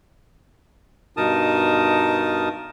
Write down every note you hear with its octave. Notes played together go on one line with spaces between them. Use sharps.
G2 B2 D#4 A#4 A5 D#6